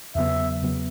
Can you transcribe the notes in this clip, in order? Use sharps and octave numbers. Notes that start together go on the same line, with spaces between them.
E2 C#3 F#3 B3 E5
E2 C#3 F#3 B3